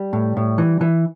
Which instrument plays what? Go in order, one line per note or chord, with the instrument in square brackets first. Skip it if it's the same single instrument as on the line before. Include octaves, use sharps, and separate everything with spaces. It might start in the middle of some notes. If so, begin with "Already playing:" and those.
Already playing: [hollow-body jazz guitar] G3
A2
A2
E3
E3